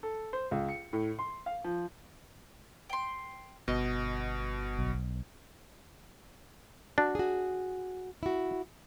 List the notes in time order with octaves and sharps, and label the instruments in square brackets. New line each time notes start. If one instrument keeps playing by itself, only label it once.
[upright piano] A4
C5
C#2
C#7
A2
C6
F5
F3
[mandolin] G5 C6
[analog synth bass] G1 [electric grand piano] B2 [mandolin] D#5
[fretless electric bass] B1
[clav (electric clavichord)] D4 [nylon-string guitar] F#4
[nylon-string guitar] F#4 G#4
E4 F#4